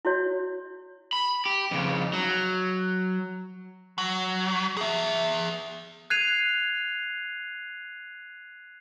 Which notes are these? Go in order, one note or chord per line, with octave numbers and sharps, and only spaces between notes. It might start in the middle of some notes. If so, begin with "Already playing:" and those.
E4 F#4 C#5
B5
G4
F2 C#3
F#3
F#3
G#4 E5
F#6 G#6 C7 D#7 F7